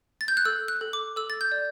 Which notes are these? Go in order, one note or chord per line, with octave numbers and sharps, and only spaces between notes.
A6
G6
F#6
A4 E6
F#6
A4
D6
A4 E6
A6
G6
D5